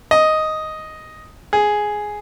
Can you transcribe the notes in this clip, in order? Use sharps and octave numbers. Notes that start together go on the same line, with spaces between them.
D#5
G#4